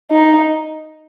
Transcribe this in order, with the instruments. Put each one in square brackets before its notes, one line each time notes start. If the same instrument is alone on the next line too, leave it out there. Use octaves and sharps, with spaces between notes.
[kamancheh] D#4